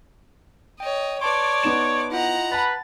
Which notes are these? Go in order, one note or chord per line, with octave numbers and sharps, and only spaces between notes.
C#5 D#5 G5
B4 C#5 D5 A5 C6 D6
B3 D#4 E7
E4 F4 D#5 F#5 A#5
B4 A5 B5 A6